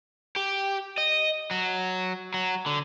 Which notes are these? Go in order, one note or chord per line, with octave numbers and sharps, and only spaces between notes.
G4
D#5
F#3
F#3
D3